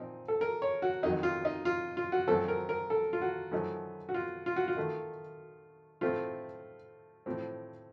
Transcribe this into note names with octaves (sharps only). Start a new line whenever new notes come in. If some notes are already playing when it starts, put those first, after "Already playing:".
Already playing: A#2 F3 C4 D#4
A4
A#4
C#5
F#4
F2 D#3 F#3 D#4
F4
D#4
F4
F4
F#4
F#2 F3 A3 C4 A4
A#4
A#4
A4
F4
F#4
F#2 F3 A3 D#4
F#4
F4
F4
F#4
F4
D#3 A3 D#4
A2 A3 C4 F4
A2 F3 C4